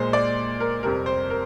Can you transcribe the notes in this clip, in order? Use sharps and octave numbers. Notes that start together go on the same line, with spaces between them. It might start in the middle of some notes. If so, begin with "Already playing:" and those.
Already playing: A#2 G#3 C5
D5
A#4
F2 C3 G3 A#4
C5
A#4